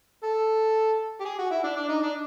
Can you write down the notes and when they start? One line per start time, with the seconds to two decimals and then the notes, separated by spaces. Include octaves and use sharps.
0.23 A4
1.20 G4
1.25 G#4
1.39 F#4
1.51 E4
1.64 D4
1.76 D4
1.89 D#4
2.03 D4